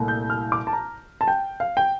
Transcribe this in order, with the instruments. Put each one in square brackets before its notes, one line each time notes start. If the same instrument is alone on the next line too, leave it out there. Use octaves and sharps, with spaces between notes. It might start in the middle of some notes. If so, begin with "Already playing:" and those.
Already playing: [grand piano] C2 A#2 A3
G6
F6
D6
A5
A#5
A5
G5
F5
G5